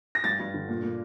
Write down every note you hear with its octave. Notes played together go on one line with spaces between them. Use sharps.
A#6
G2 A6
G2
D3
A#2
A#2